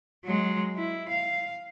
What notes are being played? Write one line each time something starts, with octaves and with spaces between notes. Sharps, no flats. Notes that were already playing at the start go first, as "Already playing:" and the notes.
F#3 G#3
E4
F5